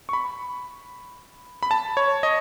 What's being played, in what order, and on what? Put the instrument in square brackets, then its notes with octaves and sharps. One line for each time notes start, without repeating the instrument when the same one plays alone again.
[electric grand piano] C#6
B5
B5
A5
C#5
D#5